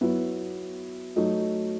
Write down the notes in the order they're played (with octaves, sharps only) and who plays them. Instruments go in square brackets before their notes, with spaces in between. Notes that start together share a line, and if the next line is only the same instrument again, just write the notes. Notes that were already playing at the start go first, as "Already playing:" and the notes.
[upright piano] F#3 B3 E4
F#3 A3 D#4